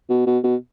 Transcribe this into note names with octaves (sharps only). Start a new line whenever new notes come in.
B2
B2
B2